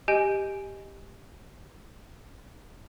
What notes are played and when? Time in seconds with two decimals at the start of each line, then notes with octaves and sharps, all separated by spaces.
0.08 G4 D#5 G#5 G6 D7